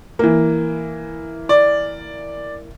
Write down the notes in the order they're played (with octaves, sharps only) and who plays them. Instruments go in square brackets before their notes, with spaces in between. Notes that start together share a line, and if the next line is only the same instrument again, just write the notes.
[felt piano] E3 A#3
[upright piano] D5